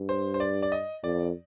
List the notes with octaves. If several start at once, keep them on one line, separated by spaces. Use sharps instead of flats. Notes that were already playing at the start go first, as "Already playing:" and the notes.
Already playing: G2
C5
C5
D5
D5
D#5
F2 D5